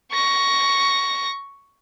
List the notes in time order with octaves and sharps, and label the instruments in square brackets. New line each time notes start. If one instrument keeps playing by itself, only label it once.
[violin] C#6 A#6